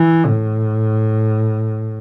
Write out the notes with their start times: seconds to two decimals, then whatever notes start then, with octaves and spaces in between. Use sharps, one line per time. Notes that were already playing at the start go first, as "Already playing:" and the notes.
Already playing: E3
0.26 A2